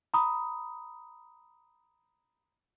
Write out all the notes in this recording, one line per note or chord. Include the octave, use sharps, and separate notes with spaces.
A#5 B5 D#6